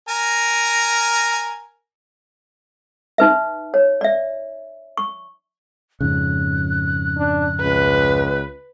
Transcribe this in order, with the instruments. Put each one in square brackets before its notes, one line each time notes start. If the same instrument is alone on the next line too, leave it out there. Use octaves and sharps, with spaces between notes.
[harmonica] A#4 G#5 A#5
[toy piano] D#4 B4 E5
C#5
D5 E5
C#6
[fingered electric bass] F2 G#2 C#3 [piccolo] F#6
[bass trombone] D4
[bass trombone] C#2 [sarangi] B4